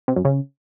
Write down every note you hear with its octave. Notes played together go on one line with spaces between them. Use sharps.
C3
F#2
C#3